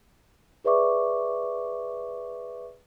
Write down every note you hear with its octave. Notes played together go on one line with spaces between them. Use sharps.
G#4 B4 D5 E5 C#6 D6